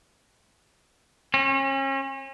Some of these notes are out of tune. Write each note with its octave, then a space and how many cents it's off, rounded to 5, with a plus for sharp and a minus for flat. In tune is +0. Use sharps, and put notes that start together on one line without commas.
C#4 -35